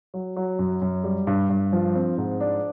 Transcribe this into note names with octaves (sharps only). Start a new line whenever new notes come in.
F#3
F#3
F#2
F#2
G3
G2
G2
F3
C4
G#2
D4